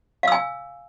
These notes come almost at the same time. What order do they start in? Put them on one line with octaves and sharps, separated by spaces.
F5 E6 G#5